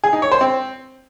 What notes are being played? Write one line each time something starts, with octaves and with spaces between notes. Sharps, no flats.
G#4
D#4
C#5
C5
C4